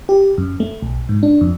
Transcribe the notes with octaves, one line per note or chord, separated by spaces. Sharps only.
G4
F#2
A3
B1
G#2
D4
F2